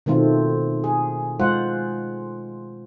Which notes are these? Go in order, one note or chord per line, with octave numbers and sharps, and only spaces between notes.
B2 D#3 A3 C4 F4
G#4
G#3 F4 C5 F#5